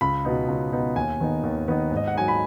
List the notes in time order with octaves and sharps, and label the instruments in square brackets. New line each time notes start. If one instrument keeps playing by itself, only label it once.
[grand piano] C#2 B5
B2 B3 D#4
C#2
B2 B3 D#4
D#2 G#5
D#3 B3 D#4
D#2
D#3 B3 D#4
G#2
D#5
F#5
F#3 D#4 G#5
B5